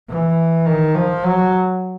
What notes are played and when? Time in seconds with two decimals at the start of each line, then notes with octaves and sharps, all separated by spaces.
0.09 E3
0.66 D#3
0.95 F3
1.24 F#3